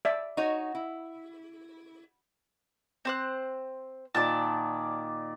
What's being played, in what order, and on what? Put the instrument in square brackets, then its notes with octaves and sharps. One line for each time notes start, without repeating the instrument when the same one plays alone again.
[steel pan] D5 E5
[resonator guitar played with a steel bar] D#4 F#4 C#5
E4
[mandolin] C4 C5 F#6
[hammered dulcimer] A#2 D#3 D5 [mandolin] A5